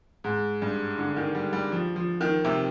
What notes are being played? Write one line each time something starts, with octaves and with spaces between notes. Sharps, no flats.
G#2
G2
D3
D#3
G3
G3
F3
F3
D#3
C3